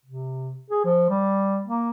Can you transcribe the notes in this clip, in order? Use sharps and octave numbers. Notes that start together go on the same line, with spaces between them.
C3
G#4
F3
G3
A#3